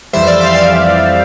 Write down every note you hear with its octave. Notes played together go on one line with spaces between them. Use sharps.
F2 E3 G3 C5 E5
D5 F5
D5 F5
D5 F5